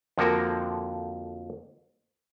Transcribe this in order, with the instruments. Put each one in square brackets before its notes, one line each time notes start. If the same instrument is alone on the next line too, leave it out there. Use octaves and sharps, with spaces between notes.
[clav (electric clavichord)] F2 D3 F3 A#3 F#4 A#4